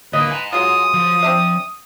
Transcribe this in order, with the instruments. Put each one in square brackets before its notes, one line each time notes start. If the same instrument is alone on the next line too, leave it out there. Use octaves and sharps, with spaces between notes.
[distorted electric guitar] D2 A#3 [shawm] B4 [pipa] D#5
[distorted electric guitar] G#5 A#5
[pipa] F#3 G#3 F4 [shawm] D#6
[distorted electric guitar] F3
[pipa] C4 D4 E5